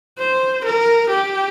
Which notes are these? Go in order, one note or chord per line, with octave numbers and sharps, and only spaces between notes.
C5
A#4
G4